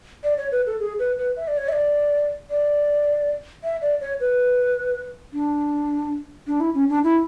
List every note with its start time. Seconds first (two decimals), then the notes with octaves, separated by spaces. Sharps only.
0.24 D5
0.38 C#5
0.52 B4
0.67 A4
0.80 G#4
0.99 B4
1.18 B4
1.37 E5
1.48 D5
1.58 C#5
1.69 E5
1.72 D5
2.50 D5
3.64 E5
3.82 D5
4.01 C#5
4.20 B4
5.33 D4
6.47 D4
6.60 E4
6.75 C#4
6.89 D4
7.04 E4